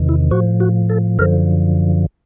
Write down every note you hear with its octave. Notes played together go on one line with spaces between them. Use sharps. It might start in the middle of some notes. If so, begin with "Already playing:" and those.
Already playing: E2 C3 D#3
E4
A2 F3 F#4
F#4
A4
F#2 D3 F3 A#4